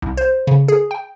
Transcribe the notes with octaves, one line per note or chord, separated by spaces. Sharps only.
C2
C5
C#3
G#4
G5